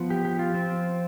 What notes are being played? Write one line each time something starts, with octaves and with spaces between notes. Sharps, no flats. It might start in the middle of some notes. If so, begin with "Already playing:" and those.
Already playing: F3 B3
G4
G4
F4
F3 C4